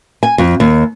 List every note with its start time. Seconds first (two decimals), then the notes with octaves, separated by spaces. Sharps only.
0.23 G#5
0.38 F2
0.60 D#2